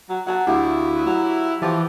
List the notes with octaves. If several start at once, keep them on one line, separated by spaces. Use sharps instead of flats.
F#3
F#3 F#5 A5
D2 E4 G4 F5
F#3
E3 F3 G4 G5